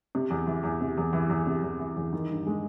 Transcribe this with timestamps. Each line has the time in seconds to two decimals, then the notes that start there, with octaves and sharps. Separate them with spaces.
0.15 C3
0.30 E2
0.47 E3
0.63 E2
0.81 C3
0.97 E2
1.13 E3
1.30 E2
1.46 C3
1.63 E2
1.80 E3
1.96 E2
2.13 D#3
2.29 G2
2.46 G#3